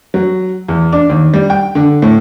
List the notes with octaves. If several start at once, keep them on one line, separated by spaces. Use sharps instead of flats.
F#3
E2
D4
D#2
G3
G5
D3
A2